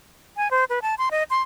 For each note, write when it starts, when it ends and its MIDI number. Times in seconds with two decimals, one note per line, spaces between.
0.37 0.51 80
0.51 0.64 72
0.70 0.79 71
0.82 0.95 81
0.98 1.09 84
1.11 1.23 75
1.30 1.42 84